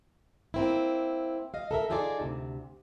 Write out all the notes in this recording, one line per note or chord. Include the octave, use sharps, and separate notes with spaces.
A#3 C4 E4
D#5 F5
A4 A#4 E5
D#4 F4 G#4 A4 D5
D2 C3